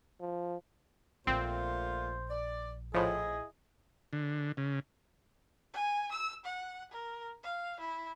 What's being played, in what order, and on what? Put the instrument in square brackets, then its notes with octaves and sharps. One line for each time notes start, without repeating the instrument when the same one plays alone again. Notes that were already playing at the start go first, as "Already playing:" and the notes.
[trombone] F3
[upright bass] A#1 [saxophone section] A#2 A3 F4 [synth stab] C4 [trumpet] C5
[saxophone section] D5
[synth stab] A2 F3 [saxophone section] E4 D#5 [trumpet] G#4
[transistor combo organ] D3
C#3
[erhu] G#5
E6
F#5
A#4
F5
E4